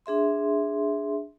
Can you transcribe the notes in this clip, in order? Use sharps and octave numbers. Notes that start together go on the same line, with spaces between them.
D4 G#4 E5 C6